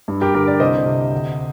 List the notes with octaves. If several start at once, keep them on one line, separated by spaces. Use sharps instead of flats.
G2
G4 A#4
D3 G4 A#4
A#4 D5
C2 C5 D#5
C3
D2